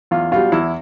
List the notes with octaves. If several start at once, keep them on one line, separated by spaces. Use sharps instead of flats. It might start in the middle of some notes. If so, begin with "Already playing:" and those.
E2 F4
B2 G3 F4
E2 E4